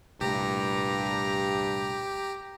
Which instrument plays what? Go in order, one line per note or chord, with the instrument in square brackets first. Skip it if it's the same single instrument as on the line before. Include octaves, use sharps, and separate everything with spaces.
[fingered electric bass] C2 A#2 A3 [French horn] G2 [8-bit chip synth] G4 [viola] A#5